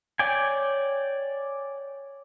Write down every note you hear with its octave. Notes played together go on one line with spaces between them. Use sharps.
C#5 D5 G5 G#5